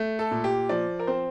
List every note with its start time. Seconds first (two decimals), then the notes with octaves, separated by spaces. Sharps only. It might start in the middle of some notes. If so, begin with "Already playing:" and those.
Already playing: A3
0.19 A4
0.31 A#2
0.44 G4
0.69 F3 D5
0.99 A#4
1.07 C4 C5